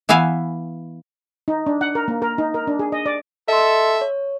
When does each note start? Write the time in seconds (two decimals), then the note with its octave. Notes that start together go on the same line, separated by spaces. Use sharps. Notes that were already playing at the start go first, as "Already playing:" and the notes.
0.09 E3 B3 E5 F5 G#5
1.48 D#4
1.67 D4
1.81 F#5
1.95 A#4
2.08 A#3
2.22 A#4
2.38 D#4
2.54 A#4
2.67 D4
2.79 G#4
2.92 D#5
3.06 D5
3.48 A4 D#5 E5 C6
4.01 C#5